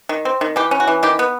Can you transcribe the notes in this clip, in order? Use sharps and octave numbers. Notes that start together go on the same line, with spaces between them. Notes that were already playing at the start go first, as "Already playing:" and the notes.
D#3
C4
D#3
E3 G4
C#4
F#4
E3
D#3 G4
B3